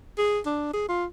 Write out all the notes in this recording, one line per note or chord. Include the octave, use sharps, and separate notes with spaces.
G#4
D4
G#4
F4